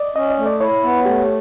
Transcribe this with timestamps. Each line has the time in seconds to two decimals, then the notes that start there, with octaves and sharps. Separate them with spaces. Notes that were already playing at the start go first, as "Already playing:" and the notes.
Already playing: D5 D#5
0.16 C#4 D#5
0.30 D#5
0.38 A3
0.46 D5
0.60 E4 C#5
0.83 B3
1.05 A3 G4